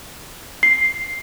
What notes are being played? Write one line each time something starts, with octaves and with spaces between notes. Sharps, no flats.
C7